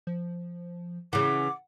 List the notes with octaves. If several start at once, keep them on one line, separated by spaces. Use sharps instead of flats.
F3
C#3 E3 F#5 D6